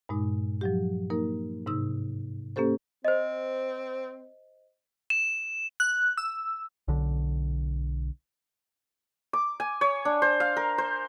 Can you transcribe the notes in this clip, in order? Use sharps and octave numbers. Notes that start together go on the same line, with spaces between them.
G2 A#2 G#3 D#4
F3 F#3 G4
A#3 D#4 A#4
G#2 C3 D#4 E6
A#3 C#4 G4 A4 C5
C4 C5 D#5
E7
F#6
E6
B1 D3
D6
G#5
C#5
D4
C5
F5
A#4
C5